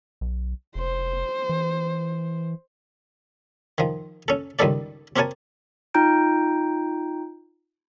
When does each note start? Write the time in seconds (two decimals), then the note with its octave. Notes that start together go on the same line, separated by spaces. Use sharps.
0.21 B1
0.75 F1 C5
1.49 E3
3.78 D#3 F3
4.28 C#4 A4
4.59 C#2 G2 D#3 G3 A4 D5
5.16 C4 G4 A#4 C#5 G#5 A5
5.94 D#4 F4 G5 A#5 G6 D7